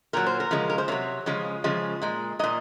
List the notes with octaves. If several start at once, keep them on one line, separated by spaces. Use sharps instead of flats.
A#2 F#3 A#4
C5
A#4
C#3 F3 G#3
A#4
C5
C3 F#3 C#5
C#3 F3 G#3
C#3 F3 G#3
A#2 G#3
A#2 F#3 D#5